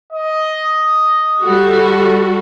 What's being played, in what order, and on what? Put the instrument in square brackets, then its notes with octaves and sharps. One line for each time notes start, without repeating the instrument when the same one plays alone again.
[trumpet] D#5
[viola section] G3 F#4 A4